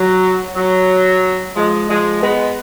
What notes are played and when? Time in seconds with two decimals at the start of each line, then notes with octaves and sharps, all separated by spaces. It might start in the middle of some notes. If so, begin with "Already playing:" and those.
Already playing: F#3
0.56 F#3
1.56 F3 G#3
1.89 F3 G#3
2.22 G#3 B3